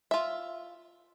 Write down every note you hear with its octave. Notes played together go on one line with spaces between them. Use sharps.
F4 E5